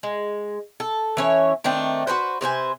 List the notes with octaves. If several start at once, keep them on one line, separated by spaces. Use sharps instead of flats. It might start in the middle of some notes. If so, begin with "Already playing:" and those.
G#3
A4
E3 C#4 C#5
D#3 A3 C4 D4
F#4 G#4 B4 C5
C3 B4 C5 G#5